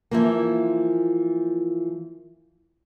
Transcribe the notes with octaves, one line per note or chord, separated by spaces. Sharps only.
E3 F3 A#3